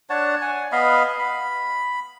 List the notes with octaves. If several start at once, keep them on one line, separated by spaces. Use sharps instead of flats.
D4 C#5 F#5 A5
F#5 G#5
B3 D#5 F5 B5
B5